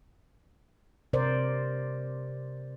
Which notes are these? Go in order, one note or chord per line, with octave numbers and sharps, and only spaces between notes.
C3 A#4 C5 D5